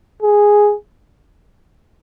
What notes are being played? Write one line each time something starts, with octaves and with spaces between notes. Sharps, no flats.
G#4